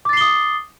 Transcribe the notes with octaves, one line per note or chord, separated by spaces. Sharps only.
D6 D#6 A6 C7 G7